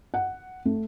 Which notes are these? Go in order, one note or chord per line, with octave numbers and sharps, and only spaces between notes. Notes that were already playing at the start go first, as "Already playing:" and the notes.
F#5
A3